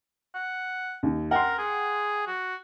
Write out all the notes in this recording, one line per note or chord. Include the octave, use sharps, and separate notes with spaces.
F#5
D#2
A#4 F#5 G5 C6
G#4
F#4